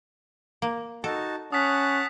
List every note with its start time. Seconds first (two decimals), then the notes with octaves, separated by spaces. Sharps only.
0.62 A#3
1.04 D#4 F#4 A4 A5
1.52 C#4 F#5 A5 D#6 F#6 B6